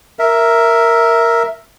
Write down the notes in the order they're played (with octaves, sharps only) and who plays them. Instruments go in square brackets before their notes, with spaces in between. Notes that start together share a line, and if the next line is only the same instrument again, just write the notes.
[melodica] A#4 E5